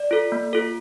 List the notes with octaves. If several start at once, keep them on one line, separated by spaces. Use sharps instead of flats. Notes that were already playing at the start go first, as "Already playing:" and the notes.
Already playing: D5
F4 A4
A#3
F4 A4